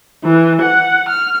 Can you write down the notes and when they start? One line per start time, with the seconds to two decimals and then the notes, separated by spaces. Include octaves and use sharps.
0.22 E3
0.61 F#5
1.08 F6